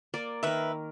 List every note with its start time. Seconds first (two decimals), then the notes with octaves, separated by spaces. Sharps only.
0.14 A#3 D5
0.43 D#3 A#4 B4 E5